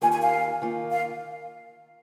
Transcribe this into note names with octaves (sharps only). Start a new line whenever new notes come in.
D#2 D#3 A#3 F4 G#5
G#5
F5
D#3 A#3 F4
F5